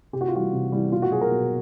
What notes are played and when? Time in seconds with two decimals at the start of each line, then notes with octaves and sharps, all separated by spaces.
0.13 C3 G4
0.21 F#4
0.28 F4
0.33 E3 G3 F#4
0.53 C3
0.72 E3 G3
0.92 B2 F4
1.02 F#4
1.12 F#3 G#4
1.21 A#4
1.31 B2